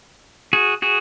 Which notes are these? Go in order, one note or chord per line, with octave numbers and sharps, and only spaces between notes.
F#4 G#4
F#4 G#4